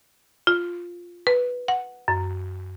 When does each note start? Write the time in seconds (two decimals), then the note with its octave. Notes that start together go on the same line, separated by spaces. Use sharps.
0.47 F4
1.27 B4
1.68 F#5
2.08 F#2